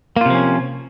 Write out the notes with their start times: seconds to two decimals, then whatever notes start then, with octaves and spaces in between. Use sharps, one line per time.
0.16 A#3
0.21 F4
0.26 C3
0.30 F3
0.35 C#4